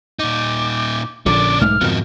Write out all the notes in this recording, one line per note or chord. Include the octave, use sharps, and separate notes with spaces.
A#2 D#4 D6
A#1 A#2 D3 C#4 D4 D6
B1 G#2 A3 F6
F2 G#2 B2 D#3 B3